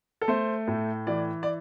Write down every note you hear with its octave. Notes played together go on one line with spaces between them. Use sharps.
A4
A3 C5
A2
E3 D5
D5